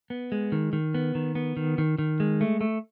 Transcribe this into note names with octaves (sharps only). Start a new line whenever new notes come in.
B3
G#3
D#3
D#3
B3
D#3
B3
D#3
D#3
D#3
G#3
A3
A3